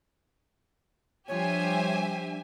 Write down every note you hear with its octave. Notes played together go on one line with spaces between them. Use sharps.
F3 G3 D4 G4 C5 C#5 E5 G#5